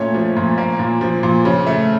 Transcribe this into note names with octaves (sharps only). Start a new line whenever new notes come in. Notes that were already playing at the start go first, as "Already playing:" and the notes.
Already playing: A#2 A3 C#4 C#5
F3
A#2
A#3
A#2
F3
A#2
C#3
A3